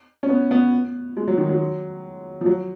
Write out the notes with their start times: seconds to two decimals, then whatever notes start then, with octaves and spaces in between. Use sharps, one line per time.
0.23 C#4
0.29 B3
0.51 B3
1.17 G#3
1.27 F#3
1.37 D#3
1.49 F#3
2.41 F3
2.46 F#3